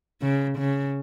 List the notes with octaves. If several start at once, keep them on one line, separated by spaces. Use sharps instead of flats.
C#3
C#3